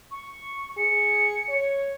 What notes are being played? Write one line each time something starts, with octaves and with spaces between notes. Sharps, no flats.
C#6
G#4 C#7
C#5